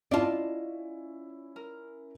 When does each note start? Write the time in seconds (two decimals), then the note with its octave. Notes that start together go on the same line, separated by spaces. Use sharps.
0.11 C#4 E4 F4 D5 D#5 F5 A5
1.56 A#4